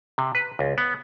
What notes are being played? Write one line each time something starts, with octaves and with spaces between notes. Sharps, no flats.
C3
B4
C#2
B3